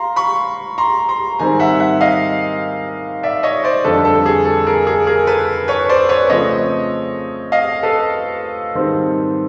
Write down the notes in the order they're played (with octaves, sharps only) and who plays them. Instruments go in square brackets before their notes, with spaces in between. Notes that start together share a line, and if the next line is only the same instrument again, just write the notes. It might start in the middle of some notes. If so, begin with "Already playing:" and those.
Already playing: [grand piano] F5 A#5 C6
B5 C#6
A#5 C6
A#5 C6
G#2 D#3 G3 C4 G#5 A#5
E5 F#5
E5 F#5
D#5 F5
D5 E5
C#5 D#5
C5 D5
F2 D3 G3 A4 B4
A4
G#4
A4
G#4 A#4
G#4 A#4
G#4 A#4
A4 B4
B4 C#5
C5 D5
B4 C#5
C#3 F3 A3 C4 C#5 D#5
D#5 F5
A4 B4
G#2 D#3 G3 C4